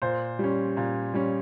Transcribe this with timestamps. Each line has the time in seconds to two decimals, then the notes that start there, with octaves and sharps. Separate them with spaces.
0.02 A#2 C5
0.39 G3 C#4
0.77 A#2
1.14 G3 C#4